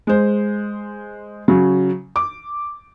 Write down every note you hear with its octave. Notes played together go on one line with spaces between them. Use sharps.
G#3 C5
C#3 F#3
D6